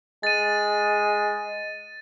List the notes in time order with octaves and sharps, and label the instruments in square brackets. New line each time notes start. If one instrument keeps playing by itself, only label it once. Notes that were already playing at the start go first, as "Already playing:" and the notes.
[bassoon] G#3 [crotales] A6 D#7